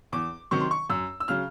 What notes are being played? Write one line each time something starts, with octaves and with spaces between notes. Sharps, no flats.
E2 D6
C3 D#3 F#3 C#6
C6
C#6
F#2 E6
E6
C#3 F#3 F6